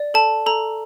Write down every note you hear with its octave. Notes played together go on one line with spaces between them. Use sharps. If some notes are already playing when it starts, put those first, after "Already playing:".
Already playing: D5
A4 A5
A4 A#5